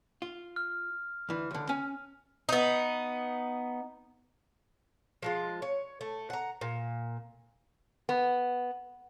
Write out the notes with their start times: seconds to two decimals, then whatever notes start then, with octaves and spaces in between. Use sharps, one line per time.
0.22 F4
0.56 F6
1.29 D2 E3
1.51 C#2 D3
1.69 C#4 G#5
2.49 B3 D#4
5.23 F3 G#3 F4
5.62 C#5
6.01 A3
6.30 F#5 A#5
6.61 A#2
8.09 B3